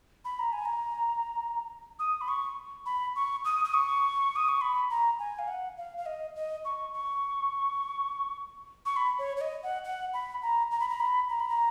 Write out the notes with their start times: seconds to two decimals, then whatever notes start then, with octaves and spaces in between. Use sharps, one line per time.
0.25 B5
0.39 A#5
0.53 G#5
0.65 A#5
1.99 D#6
2.21 B5
2.28 C#6
2.86 B5
3.16 C#6
3.45 D#6
3.65 D#6
3.74 C#6
4.36 D#6
4.49 C#6
4.61 B5
4.90 A#5
5.19 G#5
5.39 F5
5.48 F#5
5.78 F5
5.98 F5
6.06 D#5
6.36 D#5
6.65 C#6
6.94 C#6
8.86 C#6
8.97 B5
9.19 C#5
9.37 C#5
9.41 D#5
9.63 F#5
9.85 F#5
10.14 B5
10.43 A#5
10.71 A#5
10.80 B5
10.89 A#5
11.00 B5
11.29 A#5
11.40 B5
11.49 A#5